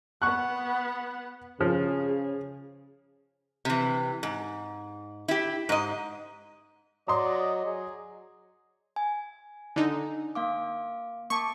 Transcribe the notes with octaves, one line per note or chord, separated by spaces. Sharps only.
B3 F#5 C#6 F#6
C#3 F3 G#4
C3 E3
G#2
E4 G4
G#2 D#5
F#3 D5 D#5 A#5 C6
F#3 G#4
G#5
D3 D#4
A#3 F5 D6
A#3 A5 C#6 D6